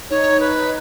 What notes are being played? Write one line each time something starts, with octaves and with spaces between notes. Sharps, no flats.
D#4 C#5
B4